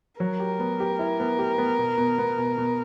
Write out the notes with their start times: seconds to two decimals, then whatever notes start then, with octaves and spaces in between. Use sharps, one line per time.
0.20 F#3 A#4
0.40 G4
0.60 B3
0.80 G4
0.99 E4
1.20 B3
1.39 G4
1.58 B3
1.78 B2
1.98 B2
2.18 B3
2.38 B2
2.58 B2